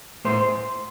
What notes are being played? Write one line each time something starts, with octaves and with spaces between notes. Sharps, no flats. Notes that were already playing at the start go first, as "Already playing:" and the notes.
A2 C5